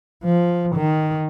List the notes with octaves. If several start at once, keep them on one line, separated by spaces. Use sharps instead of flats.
F3
D#3